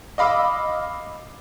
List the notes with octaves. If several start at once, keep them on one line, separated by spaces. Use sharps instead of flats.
D#5 F5 B5 D6 E6